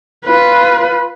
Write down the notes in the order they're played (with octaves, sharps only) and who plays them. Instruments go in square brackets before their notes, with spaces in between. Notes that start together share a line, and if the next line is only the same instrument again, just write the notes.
[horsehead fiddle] F4 B4